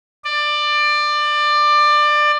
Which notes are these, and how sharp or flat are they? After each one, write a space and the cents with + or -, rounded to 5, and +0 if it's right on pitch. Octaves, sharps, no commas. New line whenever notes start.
D5 +20